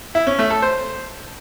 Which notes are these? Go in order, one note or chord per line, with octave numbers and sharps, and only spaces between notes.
E4
C#4
A3
A4
C5